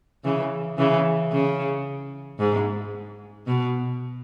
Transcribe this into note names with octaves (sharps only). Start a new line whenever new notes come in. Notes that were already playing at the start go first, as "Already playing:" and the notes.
C#3 E3
C#3 E3
C#3
G#2
B2